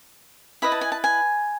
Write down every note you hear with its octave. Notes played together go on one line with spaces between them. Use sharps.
E4 B4 D#5 B5
A5
G#5
A5
G#5